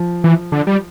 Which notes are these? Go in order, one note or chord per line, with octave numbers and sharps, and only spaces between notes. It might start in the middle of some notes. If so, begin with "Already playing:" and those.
Already playing: F3
E3
D3
G3